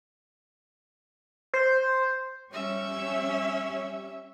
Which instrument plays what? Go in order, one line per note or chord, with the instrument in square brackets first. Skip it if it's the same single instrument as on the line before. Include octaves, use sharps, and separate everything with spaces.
[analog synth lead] C5
[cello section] G3 G4 C#5 [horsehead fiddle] C#4 E5